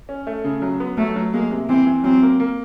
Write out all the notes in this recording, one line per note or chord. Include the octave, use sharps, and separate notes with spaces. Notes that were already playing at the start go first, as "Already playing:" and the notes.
C#4
A3
C#3
F#3
B3
F#3 A3
F#3
G#3 A#3
C3
E3 C4
E3
F#3 C4
A#3
A#3